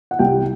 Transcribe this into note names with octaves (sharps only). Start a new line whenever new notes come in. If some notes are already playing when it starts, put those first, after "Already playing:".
F#5
C2 G5